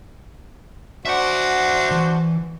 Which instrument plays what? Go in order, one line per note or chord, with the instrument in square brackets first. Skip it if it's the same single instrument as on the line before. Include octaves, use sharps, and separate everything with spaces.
[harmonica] D4 F#4 C5 [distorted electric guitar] E5 F#5
[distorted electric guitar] E3